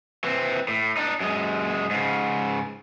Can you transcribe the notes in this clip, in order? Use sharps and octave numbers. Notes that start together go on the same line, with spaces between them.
E3 C4
A2
D4 D#4
F#2 G#3
G#2 C#3